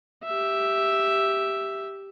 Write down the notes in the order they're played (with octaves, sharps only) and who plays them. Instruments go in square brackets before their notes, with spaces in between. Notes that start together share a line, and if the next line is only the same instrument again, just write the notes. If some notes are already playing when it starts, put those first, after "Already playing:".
[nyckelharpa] G4 E5